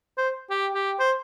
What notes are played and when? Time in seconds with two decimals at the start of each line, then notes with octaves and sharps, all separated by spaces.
0.18 C5
0.50 G4
0.74 G4
1.00 C5